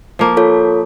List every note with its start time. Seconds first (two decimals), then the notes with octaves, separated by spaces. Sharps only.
0.19 F3 A#3
0.37 F4 A4 C#5